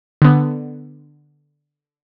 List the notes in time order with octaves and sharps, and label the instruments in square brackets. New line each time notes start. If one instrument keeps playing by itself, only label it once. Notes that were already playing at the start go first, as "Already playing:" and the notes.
[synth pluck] D3 B3